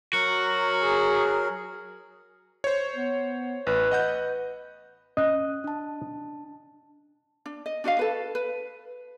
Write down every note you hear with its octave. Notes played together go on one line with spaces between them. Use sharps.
F#3 F#4 A#4
G#4
C5 C#5
B3
A1 B4
D#5 F#5 G6
C#4 D#5 F#6
D4 A5
D4
D#5
D4 F#4 D#5 F5
A4 B4
B4